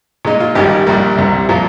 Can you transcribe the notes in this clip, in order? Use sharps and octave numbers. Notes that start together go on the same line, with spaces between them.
A#2 G#3 D#4
F4
G#1 G#2 D#3 G3 G4
A#1 A#2 G3 A#3
C2 C3 G3
A#2 F3 A#3